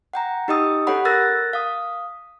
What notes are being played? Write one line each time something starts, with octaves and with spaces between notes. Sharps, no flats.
F#5 G5 A#5
D#4 G4 D#5 G5 D#6 E6
C#4 G4 A4 C#5 F#5 B5
A#4 E6 F#6 A6 A#6
F5 D#6